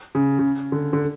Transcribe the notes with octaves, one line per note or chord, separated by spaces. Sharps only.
C#3
C#3
D3
D3